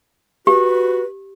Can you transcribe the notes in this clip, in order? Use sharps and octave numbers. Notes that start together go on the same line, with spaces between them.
F#4 G4 B4